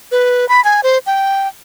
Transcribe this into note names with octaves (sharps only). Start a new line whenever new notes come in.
B4
B5
G#5
C5
G5